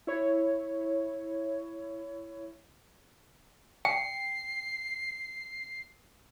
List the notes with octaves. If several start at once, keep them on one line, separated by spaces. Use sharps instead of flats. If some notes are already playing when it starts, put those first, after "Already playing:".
E4 C#5
G5 C7